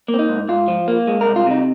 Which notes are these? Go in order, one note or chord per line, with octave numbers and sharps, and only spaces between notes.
A#3
C4
D#4
G#2
G#2 F4
F3
A#3
G#3
C2 A#4
F4
C3 D#4